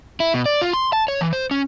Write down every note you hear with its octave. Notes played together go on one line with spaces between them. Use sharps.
E4
B2
D5
F4
C6
A5
C#5
E3
C5
C#4